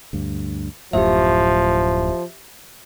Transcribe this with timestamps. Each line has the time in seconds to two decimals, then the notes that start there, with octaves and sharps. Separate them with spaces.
0.13 D2 G2
0.93 D1 F#2 A2 F3 G4 E5